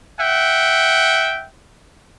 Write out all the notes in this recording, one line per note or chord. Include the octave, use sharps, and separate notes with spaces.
E5 F#5 G5